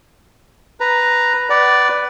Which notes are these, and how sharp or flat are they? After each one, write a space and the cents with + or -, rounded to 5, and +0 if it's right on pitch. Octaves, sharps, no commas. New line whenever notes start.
B4 +0 A#5 +0
B4 +0 D5 +0 F#5 +35